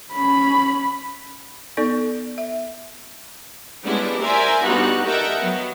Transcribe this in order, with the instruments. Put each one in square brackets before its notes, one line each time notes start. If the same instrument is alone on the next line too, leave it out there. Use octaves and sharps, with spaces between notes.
[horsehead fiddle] C#4 B5
[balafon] B3 D#4 A4 D5
E5
[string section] G3 G#3 B3 C#4 D4 E4
A#4 C5 D5 E5 G#5 A#5
G2 G3 B3 D#4 F#4 F#6
A4 A#4 D#5 E5 F#5 G5
F#3 B3